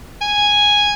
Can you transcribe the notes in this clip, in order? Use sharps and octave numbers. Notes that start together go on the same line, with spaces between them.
G#5